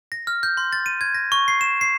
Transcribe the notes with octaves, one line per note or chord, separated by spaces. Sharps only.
A#6
F6
G6
C6
A6
D#7
G#6
A#6
C#6
C7
E7
C7